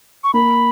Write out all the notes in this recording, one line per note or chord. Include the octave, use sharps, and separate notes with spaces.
C#6
A#3 B5